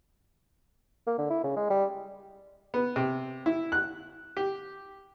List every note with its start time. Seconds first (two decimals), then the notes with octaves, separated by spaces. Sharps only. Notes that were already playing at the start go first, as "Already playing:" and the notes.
1.07 A#3
1.18 D3
1.30 E4
1.44 C#3
1.56 G#3
1.70 G3
2.74 B3
2.96 C3
3.46 E4
3.72 F#6
4.37 G4